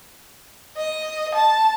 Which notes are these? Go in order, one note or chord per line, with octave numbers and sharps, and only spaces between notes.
D#5
A5